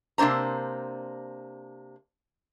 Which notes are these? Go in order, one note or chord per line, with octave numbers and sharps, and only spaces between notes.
C3 A#3 D4 C5 A#5